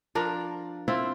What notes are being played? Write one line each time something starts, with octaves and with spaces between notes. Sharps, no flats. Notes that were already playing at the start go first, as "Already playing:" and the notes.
F3 D4 A#4
C4 E4 F4